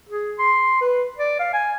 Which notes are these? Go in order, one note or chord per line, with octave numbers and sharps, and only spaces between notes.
G#4
C6
B4
D5
F5
G#5